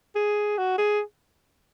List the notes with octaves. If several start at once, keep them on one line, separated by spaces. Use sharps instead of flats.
G#4
F#4
G#4